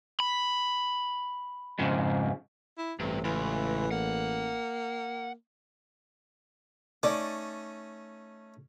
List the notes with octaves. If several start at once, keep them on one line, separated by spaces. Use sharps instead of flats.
B5
F2 G#2 C#3
E4
A1 G2 C3
C#2 E3
A#3 F#5
A3 C#4 D#4 D5